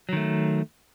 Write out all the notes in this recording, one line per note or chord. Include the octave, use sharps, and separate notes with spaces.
D#3 F#3 A3